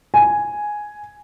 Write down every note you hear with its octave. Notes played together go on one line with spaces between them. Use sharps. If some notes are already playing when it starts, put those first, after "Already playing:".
G#5